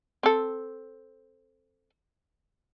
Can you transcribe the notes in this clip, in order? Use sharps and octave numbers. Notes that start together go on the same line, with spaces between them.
C4 A4